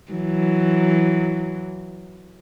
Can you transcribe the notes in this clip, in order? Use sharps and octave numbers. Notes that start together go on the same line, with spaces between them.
E3 F#3